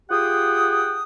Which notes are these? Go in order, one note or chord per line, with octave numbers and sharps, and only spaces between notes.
F4 G4 G#4 F#5 G5 D#6